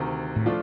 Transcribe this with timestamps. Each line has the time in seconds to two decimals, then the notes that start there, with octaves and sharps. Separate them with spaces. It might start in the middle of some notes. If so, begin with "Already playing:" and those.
Already playing: D2 C3 D#3
0.36 A2
0.46 F3 A3 D4 F4